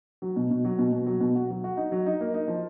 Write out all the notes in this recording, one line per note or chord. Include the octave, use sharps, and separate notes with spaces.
F#3
B2
B2
F#3
B2
B2
F#3
B2
F#4
F#3
F#4
D#4
F#3
D#4
A#3
D#4
F3